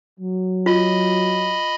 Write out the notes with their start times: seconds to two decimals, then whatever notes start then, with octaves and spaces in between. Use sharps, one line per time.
0.20 F#3
0.66 F4 D#5 B5